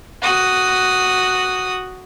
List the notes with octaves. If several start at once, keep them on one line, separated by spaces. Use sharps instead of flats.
F#4 D#6